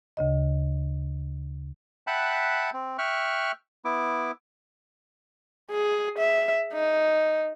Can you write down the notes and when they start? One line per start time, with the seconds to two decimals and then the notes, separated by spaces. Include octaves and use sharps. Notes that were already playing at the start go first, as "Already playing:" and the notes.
0.17 D2 C#3 D#5
2.07 E5 F#5 G5 A5 B5 F#6
2.73 C4
2.98 E5 G5 C#6 F6 F#6
3.85 B3 E4 D6
5.71 G#4
6.19 E5
6.73 D#4